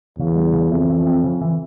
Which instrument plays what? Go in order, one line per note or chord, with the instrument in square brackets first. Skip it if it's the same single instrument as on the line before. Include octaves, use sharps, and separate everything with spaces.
[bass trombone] E2 [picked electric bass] C#3
[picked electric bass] G3
C#3
[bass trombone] F2 [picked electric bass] E3
[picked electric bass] E3
C4
C#3
E3